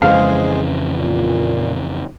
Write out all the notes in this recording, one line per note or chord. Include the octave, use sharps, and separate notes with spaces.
F2 C#3 E3 G#3 G#4 C5 F5
A#2